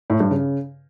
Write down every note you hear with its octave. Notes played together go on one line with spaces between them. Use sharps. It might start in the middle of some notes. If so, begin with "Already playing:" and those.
A2
G2
C#3